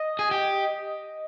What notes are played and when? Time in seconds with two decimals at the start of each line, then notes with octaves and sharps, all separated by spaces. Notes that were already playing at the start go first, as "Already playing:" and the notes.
Already playing: D#5
0.19 G#4
0.31 G4